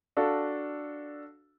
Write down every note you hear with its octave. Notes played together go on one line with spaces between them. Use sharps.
D4 F#4 A4 F5